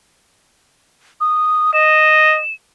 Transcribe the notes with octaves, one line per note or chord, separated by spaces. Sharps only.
D#6
D#5 E7